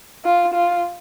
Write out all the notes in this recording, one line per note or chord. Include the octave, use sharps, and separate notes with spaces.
F4
F4